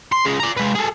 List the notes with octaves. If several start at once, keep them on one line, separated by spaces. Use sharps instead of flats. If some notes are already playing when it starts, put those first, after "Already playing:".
C6
C#3 G#3
D5 A#5
G#3 B4
G#4 A4